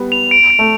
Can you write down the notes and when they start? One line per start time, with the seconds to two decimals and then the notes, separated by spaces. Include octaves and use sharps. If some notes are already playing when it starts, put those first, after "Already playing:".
Already playing: G3 B3
0.12 F7
0.31 D7
0.50 D7
0.59 A3